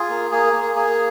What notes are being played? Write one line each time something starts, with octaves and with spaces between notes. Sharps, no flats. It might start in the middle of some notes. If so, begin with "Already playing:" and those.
Already playing: F4 G#4
A#3
A#3 G#4
A#3
A#3 G#4